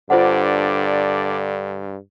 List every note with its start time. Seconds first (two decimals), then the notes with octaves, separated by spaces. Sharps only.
0.10 G2 D3 F4 C5 D5 F#5